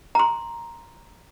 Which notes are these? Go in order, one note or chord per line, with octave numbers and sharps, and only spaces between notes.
A#5 C6